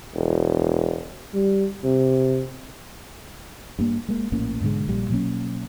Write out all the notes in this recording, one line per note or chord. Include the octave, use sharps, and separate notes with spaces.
E1
G3
C3
G2 A#3
G#3 A#3
A#1 A2 A#3 C#4
G#2 B2 D3 G#3
A#1 A#2 G3
B2 F#3 A#3 C#4